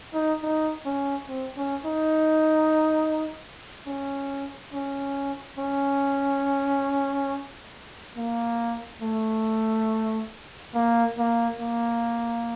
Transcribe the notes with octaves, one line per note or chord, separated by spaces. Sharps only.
D#4
D#4
C#4
C4
C#4
D#4
C#4
C#4
C#4
A#3
A3
A#3
A#3
A#3